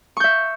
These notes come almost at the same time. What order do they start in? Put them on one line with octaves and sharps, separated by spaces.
C#6 G6 E5